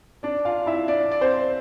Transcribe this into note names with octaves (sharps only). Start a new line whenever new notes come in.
D4 D5
F4 F5
E4 E5
D4 D5
D5
C4 C5